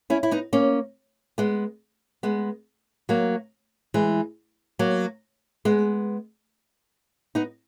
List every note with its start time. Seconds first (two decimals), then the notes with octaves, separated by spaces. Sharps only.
0.10 C#4 E4
0.23 E4
0.31 B3 D#4
0.53 A#3 C#4
1.38 G#3 B3
2.23 G#3 B3
3.09 F#3 A#3
3.94 E3 G#3
4.79 F#3 A#3
5.65 G#3 B3
7.35 B3 D#4